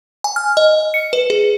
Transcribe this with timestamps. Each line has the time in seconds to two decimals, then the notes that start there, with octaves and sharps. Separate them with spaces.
0.24 G#5
0.36 F6
0.57 D#5
0.94 C#7
1.13 B4
1.30 G#4